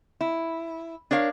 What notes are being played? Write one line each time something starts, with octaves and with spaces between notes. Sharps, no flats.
E4
D4 A#4 C#5 F5